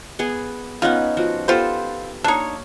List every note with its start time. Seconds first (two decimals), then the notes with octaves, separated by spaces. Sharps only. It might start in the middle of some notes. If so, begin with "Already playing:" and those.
0.19 B3 G#4
0.82 B3 C#4 D#4 F4 F#5
1.17 F3 F#4
1.48 B3 F4 G4 A4 C5
2.24 A#3 D4 D#4 C#5